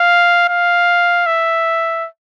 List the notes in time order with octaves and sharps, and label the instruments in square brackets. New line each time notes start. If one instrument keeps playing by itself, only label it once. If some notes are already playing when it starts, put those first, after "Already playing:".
Already playing: [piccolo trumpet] F5
F5
E5